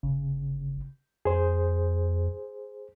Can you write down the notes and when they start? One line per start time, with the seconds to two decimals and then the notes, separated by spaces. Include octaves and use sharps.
0.03 G1 C#3
1.25 F2 G#4 C5